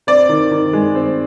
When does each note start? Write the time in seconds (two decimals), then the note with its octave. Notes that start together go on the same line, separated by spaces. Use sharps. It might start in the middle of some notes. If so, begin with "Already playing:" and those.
0.07 C4 D5
0.29 D#3
0.51 D#3
0.73 G#3
0.95 C4